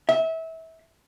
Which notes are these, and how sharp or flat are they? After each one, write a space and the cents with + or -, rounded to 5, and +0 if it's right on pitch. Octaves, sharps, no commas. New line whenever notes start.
E5 -25